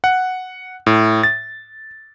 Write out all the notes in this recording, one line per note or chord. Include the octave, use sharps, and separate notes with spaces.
F#5
A2
A6